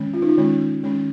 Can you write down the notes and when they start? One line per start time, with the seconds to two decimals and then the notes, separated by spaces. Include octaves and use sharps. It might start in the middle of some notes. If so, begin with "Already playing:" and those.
Already playing: D#3 G#3 C#4
0.14 F4
0.22 D#4
0.29 F4
0.37 D#3 G#3 C#4
0.83 D#3 G#3 C#4